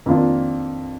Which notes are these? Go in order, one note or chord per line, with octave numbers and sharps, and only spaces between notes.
F2 D#3 A#3 D4 F4